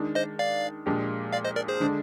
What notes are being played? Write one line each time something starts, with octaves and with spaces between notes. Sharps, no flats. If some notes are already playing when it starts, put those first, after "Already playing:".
Already playing: D#3 G#3 D4
C5 D#5
D5 F5
A#2 F3 G#3 D4 G4
D5 F5
C5 D#5
A#4 D5
G#4 C5
D3 G#3 D4